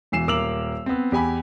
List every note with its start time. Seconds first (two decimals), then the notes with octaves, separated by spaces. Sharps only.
0.12 E1 E3 C7 E7
0.28 D#1 A#4 D6 E6 F7 F#7
0.86 B3 C4
1.12 E2 G4 G#5 B5